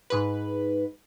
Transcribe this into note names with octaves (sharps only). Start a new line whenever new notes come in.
G#2 B4